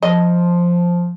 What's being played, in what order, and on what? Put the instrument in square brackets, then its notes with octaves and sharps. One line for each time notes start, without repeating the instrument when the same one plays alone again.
[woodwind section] F3 [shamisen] D#5